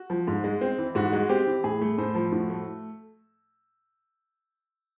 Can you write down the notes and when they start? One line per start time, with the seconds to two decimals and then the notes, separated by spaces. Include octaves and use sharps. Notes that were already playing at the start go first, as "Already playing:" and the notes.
Already playing: F#4
0.10 F3
0.28 G#2
0.44 G#3
0.61 C4
0.78 E3
0.95 G#2 F#4
1.13 G#3
1.29 C4 G4
1.47 E3
1.64 A2 G#4
1.81 A3
1.98 A2 C5
2.15 F3
2.32 A2 F#4
2.49 A3